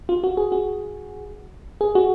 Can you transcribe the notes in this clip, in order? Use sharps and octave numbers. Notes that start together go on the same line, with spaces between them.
F4
F#4
G#4
F#4
G#4
F#4